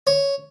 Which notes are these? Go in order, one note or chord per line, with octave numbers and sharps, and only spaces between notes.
C#5